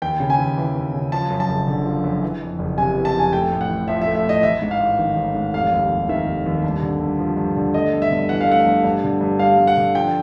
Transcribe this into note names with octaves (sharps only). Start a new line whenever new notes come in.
D#2 G5
C#3
G#5
D#2
E3
D#2
C#3
F3 A5
F#2
A5
F#1
D3
F3
F#2
E3
F2
F#1
C3 G#5
E3
A5
F2 G#5
A3 G5
A2
F#5
A1
F3 E5
E5
A3
E5
A2 D#5
A1 E5
G#2
F5
A1
D#3
A1
G#2
F1 F5
D#2
F1
D#3 E5
F1
D#2
G2
D3
G2
F3
G2
D3
A3 D#5
G2
E5
G1
E3 F#5
F5
A3 F#5
G2
G2
D3
G2
G3 F5
G2
F#5
D3
F3 G5